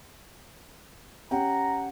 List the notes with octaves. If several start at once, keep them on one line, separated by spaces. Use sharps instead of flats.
C#4 G4 F#5 G5 A#5